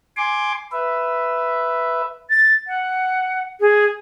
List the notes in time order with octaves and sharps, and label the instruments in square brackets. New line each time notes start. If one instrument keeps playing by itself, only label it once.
[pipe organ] G#5 C6 D6
B4 E5
[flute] A6
F#5
G#4